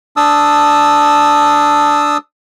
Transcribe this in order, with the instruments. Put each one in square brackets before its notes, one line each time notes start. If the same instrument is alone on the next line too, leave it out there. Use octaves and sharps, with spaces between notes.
[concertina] D4 A5 D#6 E6